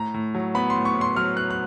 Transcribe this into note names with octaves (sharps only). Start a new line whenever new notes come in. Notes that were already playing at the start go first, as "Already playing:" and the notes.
Already playing: A2 A#5
A2
F#3
B3 B5
C6
A2
C#6
A2
C6
F#3 F6
B3 F#6
F#6